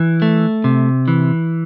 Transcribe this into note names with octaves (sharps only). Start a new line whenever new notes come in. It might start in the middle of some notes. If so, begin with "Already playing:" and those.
Already playing: E3
A3
C3
E3